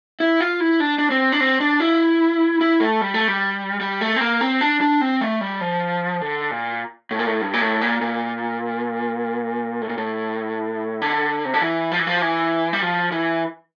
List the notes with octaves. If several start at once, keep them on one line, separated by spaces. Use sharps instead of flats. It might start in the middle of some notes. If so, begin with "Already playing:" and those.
E4
F4
E4
D4
D4
C4
D4
C4
D4
E4
E4
A3
G3
A3
G3
G3
A3
C4
A#3
C4
D4
D4
C4
A3
G3
F3
D3
A#2
A2
A#2
A2
G2
A#2
A2
A#2
A#2
A2
A#2
A2
D3
C3
D3
E3
F3
E3
F3
E3
G3
F3
E3